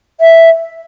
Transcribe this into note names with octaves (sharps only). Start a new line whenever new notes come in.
E5